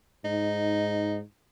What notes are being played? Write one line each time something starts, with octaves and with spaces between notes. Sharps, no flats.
G#2 D#4